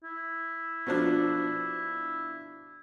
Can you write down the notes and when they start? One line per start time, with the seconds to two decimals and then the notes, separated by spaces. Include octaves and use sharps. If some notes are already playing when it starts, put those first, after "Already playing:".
0.03 E4
0.86 B2 F3 D4